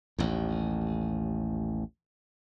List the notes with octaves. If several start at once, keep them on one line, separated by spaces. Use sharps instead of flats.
A1 D#2